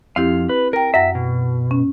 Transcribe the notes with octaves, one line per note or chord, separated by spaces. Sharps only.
F2 C4 E4 G4 F5
B4
A#4 G5 A#5
F#2 E5 F#5 A#6
B2
C#4